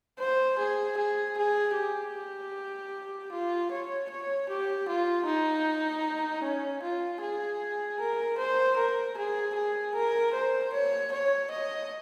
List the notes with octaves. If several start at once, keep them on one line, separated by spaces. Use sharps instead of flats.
C5
G#4
G#4
G#4
G4
F4
C#5
C#5
G4
F4
D#4
C#4
F4
G#4
A#4
C5
A#4
G#4
G#4
A#4
C5
C#5
C#5
D#5